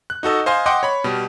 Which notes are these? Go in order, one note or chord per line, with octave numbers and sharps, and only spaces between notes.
F#6
D#4 F#4 A4 D#5
C5 D#5 F5 G#5 C6
D#5 F#5 G5 C6 D6
C#5 B5
B2 G3